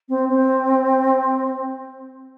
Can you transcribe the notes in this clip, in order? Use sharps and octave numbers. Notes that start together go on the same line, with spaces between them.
C4
C4